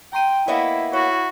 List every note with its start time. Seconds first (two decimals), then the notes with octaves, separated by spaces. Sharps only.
0.13 G5 A#5 C6 D#7
0.48 A#3 B3 E4 C#5 D#5 E5
0.93 E4 F#4 C#5